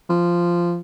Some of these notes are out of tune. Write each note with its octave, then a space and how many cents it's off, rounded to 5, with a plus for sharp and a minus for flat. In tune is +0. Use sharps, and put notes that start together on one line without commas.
F3 -10